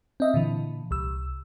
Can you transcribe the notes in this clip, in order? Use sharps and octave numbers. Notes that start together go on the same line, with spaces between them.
C4 D#5 E5
A#2 D3 E3
C2 E6